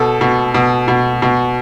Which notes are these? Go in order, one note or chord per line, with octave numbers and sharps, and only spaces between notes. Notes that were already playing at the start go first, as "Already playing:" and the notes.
Already playing: B2 A4
B2
B2
B2
B2